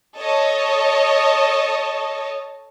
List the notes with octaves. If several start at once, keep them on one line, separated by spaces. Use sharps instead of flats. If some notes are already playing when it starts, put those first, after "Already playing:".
A4 C#5 D#5